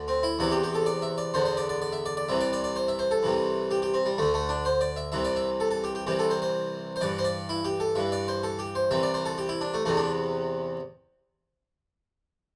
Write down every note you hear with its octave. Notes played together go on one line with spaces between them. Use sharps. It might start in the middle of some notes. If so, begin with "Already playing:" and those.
Already playing: D2 D3
C4
E4
E2 C3 E3 E4
G4
G4
A4
D5
E5
D5
E2 D3 C5
C5
D5
D5
D5
E5
D5
D5
C2 C3 E3 E5
D5
D5
D5
C5
E5
C5
A4
C2 C3 E3
G4
G4
C4
G3
D2 D3 A3
A3
D4
C5
D5
E5
C2 C3 E3 E5
D5
E5
A4
A4
G4
G4
C2 C3 E3 G4
A4
C5
C5
C5
G2 E3 D5
C5
D5
E4
G4
A4
G2 E3 E5
D5
C5
A4
G4
C5
C2 C3 E3 E5
D5
C5
A4
G4
E4
D4
A3
E2 C3 E3 A3
D4